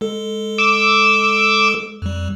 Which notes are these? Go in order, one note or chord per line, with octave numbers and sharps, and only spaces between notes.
G#3 A4
D6 E6
F2 G3